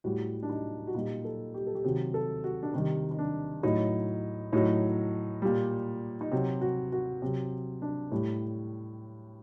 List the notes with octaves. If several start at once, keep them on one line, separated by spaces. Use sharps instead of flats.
A2 G3 F#4
D4
D#4
F#4
A#2 G3 D#4
A4
G4
A4
G4
C3 D#3 F#3 F#4
A4
F#4
D4
C3 D#3 G3 D#4
D#4
D4
A2 F#3 D#4
A2 F#3 D#4
A#2 G3
D#4
C3 F#3 F#4
F#4
F#4
C3 F#3
D4
A2 G3